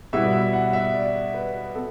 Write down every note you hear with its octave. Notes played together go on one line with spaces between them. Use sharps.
B2 G3 B3 E4 E5
E5
F#5
E5
D5
B4
B3 A4